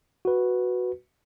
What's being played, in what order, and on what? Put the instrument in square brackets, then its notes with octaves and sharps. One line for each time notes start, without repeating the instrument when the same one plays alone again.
[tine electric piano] F#4 B4